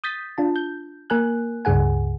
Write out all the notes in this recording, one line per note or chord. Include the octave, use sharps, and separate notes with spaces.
D#6 G6 A6 B6
D4 F4 A5
G6
A#3 A#4 G#5 F#6
C#2 G2 C#3 G#4 F#5 G#5